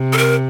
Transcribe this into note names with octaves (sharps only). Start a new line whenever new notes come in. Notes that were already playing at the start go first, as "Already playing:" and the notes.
Already playing: C3
A4
A#4